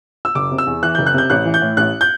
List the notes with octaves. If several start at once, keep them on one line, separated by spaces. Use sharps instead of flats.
E6
F#1 D6
C3
E6
E2
E3 F#6
F#1 G6
F#6
C3 G6
A1 F#6
E3
G6
A2
A1 F#6
G6